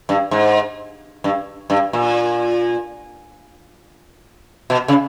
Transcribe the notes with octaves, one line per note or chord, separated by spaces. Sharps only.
G2
G#2
G2
G2
A#2
B2
C#3